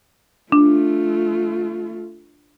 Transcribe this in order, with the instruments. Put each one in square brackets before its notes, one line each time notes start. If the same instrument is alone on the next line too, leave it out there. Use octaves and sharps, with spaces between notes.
[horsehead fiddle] A3 F4 [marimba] D4